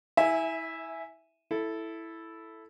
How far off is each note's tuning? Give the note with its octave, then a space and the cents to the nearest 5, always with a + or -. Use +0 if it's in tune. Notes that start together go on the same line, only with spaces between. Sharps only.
E4 -25 E5 +0 G#5 +0
E4 +0 A4 +0